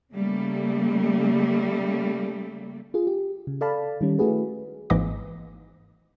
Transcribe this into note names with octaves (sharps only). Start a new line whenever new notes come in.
C#3 G3 A3 A#3
F4 G#4
G4
C#3
A4 D5 F5 A5 B5
D#3 G3 C#4
A3 E4 F#4 G#4 B4
G#1 G#2 E3 A#3 D#5 D6